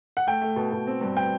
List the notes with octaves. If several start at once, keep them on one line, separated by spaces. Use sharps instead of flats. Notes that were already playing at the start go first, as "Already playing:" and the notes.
F#5
A3 G5
A3
B2
B2
C4
G2
G5